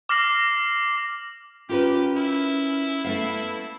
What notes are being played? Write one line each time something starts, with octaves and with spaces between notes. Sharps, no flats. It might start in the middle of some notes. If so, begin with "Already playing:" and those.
D6 F6 A#6 C7 F#7
C#4 F4 G4 A#4 B4
E4
A3 B3 F5